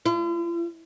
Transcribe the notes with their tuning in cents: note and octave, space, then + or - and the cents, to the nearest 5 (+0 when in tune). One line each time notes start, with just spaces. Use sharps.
F4 -45